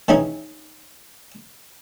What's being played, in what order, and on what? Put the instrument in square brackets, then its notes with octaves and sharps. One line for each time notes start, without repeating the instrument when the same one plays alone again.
[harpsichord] D#3 E3 C#4 D#4 G#4